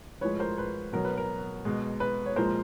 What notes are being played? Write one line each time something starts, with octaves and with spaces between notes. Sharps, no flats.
A2 F3 G#3 B4 C#5
A#4 C5
B4
B2 F#3 A#4
B4
A#4
B2 G#3
B4
C#5
A#2 F3 G#3 A#4 C5